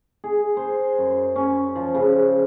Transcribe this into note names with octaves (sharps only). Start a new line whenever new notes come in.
G#4
C5
F#2
C#4
F3
C#3